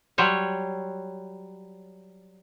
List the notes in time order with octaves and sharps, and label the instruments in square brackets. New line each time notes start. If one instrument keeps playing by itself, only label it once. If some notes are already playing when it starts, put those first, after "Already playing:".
[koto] F#3 G3 C5 C#5